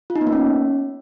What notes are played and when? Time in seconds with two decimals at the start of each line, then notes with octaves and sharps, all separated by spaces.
0.10 F4
0.16 D#4
0.21 B3
0.27 A#3
0.33 C#4